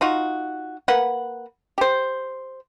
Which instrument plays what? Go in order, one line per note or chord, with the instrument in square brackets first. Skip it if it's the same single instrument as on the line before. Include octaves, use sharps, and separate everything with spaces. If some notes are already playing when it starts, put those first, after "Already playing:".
[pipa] D#4 F4 F#4
A#3 B4 F#5
G4 C5